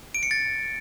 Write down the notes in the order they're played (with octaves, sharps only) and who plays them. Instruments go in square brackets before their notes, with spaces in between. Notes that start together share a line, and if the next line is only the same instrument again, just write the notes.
[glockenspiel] D7
C#7
A6